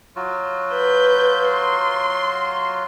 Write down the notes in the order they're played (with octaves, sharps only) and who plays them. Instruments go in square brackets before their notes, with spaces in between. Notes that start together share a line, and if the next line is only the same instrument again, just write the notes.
[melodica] F#3 F4 F#4
[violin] B4 G6
C6